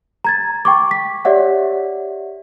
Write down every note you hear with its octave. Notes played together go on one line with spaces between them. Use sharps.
A#5 G#6 A6
G5 C#6 D6
B6
G4 C#5 D5 E5 F#5